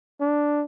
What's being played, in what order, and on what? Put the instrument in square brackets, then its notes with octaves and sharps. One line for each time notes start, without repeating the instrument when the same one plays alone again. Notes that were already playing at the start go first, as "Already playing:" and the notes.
[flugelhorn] D4